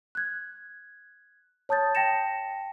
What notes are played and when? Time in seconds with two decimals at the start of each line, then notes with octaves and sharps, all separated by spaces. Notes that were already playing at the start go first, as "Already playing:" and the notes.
0.15 F#6 G#6
1.69 C#5 A5 D#6 G6 A6
1.95 G5 A5 A#6 C#7 E7